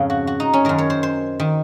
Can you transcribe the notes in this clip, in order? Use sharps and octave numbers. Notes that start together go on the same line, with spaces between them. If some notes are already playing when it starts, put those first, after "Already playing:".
Already playing: F2 G#2 C#3
F#4
F#4
D#4
C#4
F#2 D#3 A#4
C#5
C5
C5
D#3